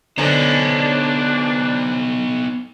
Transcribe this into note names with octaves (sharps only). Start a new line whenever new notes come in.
D3 B3 D4 D#4 C5 C#5 G#5